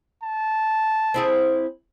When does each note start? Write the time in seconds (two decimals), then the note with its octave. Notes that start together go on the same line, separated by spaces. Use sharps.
0.23 A5
1.14 C4 E4 G#4